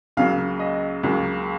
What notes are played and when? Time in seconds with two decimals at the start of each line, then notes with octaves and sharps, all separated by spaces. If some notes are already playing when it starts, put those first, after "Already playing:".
0.17 C#2 C#3 F#3 A#3 F5
0.60 D#5
1.03 C#2 C#3 F#3 A#3